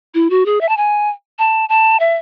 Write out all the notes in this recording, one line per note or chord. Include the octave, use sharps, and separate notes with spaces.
E4
F#4
G#4
E5
A5
G#5
A5
A5
E5